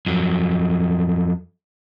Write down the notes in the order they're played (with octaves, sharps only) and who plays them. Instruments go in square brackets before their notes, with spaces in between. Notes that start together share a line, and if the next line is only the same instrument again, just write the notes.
[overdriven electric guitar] F2 F#3